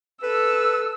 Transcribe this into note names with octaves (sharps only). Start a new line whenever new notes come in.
A4 B4 E6